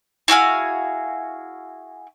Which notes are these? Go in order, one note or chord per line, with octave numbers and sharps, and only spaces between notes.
E4 F#4 G#4 F5